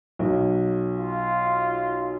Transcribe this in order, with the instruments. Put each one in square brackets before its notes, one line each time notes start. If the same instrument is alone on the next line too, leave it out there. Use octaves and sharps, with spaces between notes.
[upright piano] B1
[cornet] F4